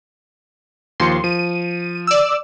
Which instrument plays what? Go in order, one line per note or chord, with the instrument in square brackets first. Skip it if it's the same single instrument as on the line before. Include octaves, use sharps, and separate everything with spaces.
[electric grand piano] D#2 F3 C#7 [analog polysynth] C6
[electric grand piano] F3 [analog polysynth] D#7
[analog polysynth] D5 E6